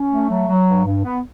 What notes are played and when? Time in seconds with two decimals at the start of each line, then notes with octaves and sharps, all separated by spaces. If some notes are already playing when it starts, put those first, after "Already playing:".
Already playing: C#4
0.10 A3
0.29 F#3
0.48 F#3
0.67 G2
0.85 G2
1.04 B3